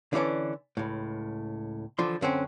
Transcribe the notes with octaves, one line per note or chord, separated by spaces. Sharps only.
D3 E3 A3 C#4 D4
C#2 A2
D3 E3 F3 C6
F#2 D3 C4 C#4